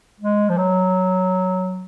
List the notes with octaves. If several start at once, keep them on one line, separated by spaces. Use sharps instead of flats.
G#3
F3
F#3